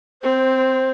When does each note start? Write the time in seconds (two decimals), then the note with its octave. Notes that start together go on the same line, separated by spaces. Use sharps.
0.23 C4 C5